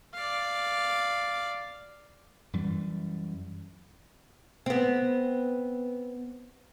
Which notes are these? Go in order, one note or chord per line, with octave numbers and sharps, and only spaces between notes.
D5 F5
F#2 E3 G3
B3 C4